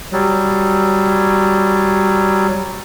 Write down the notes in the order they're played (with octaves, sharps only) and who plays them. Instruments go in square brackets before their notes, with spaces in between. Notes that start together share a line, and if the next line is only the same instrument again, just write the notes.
[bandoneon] F#3 G3